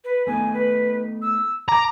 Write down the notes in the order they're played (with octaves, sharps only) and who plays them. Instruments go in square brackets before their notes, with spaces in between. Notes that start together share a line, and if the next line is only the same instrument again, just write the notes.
[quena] B4
[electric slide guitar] A3 B3 D#4 [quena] G#5
[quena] B4
E6
[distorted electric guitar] A#5 [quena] D6